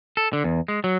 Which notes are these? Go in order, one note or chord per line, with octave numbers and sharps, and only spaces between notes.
A4
D3
E2
G#3
F#3